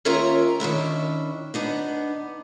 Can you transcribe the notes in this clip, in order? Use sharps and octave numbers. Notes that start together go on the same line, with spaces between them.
D#2 C#4 F4 A#4 E5 A#5
D#3 C#4 D4 E4
B3 D4 D#4